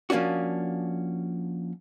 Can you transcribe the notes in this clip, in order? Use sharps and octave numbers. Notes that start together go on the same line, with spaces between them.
F3 A#3 C#4 D4 F#4